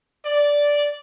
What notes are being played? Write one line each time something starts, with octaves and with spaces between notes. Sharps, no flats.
D5